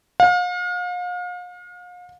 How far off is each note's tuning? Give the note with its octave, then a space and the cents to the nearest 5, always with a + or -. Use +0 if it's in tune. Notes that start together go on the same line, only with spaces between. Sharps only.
F5 +40